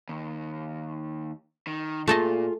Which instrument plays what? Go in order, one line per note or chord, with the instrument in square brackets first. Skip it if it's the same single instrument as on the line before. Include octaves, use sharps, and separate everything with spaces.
[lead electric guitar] D#2
D#3
[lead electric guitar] A#2 [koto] A3 A4 D#5 [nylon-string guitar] F4 G#4 G#5